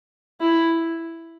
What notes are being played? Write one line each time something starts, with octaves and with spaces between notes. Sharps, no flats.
E4